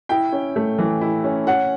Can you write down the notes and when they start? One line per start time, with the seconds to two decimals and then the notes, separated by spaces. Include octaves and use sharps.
0.09 E4 G5
0.32 C#4
0.56 A3
0.79 E3
1.01 E4
1.24 C#4
1.47 C#4 F#5